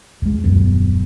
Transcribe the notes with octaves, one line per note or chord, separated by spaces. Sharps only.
D2 G#3
D#1 F#2 B3